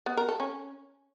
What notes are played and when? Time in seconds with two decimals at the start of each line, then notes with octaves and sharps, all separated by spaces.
0.06 B3
0.17 A#4
0.29 A4
0.40 C#4